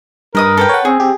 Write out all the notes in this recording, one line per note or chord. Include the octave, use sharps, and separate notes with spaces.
G2 A#4 B4 D#5 D#6
A4 B4 G5
C#5 F#5
C4 G#4
C4 G4